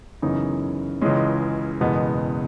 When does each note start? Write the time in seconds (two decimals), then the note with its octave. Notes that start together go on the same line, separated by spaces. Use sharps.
0.22 F#2 C#3 E3 B3 D#4
1.01 C#2 C#3 E3 G#3 C#4
1.80 F#1 E2 B2 G#3 B3